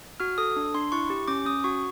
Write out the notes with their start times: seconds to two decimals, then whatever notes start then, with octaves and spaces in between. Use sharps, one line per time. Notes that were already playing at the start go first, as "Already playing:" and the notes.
0.20 F#4 F6
0.38 A4 D#6
0.56 D4
0.75 D4 C6
0.92 E4 C#6
1.10 G4
1.28 C#4 D6
1.45 C#4 D#6
1.64 F#4 C#6